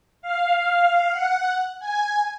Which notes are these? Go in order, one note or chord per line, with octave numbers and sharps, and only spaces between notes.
F5
F#5
G#5